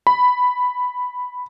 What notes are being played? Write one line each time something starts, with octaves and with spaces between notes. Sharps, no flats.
B5